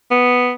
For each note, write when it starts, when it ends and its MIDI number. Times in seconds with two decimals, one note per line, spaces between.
0.11 0.52 59